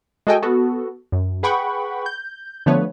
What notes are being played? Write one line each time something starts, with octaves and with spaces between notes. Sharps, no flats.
G#3 F#4 A4 D#5 G5 G#5
B3 F#4 A4
F#2
G#4 B4 F#5 G5 B5 C#6
G6
D3 F3 A3 B3 B4 C#5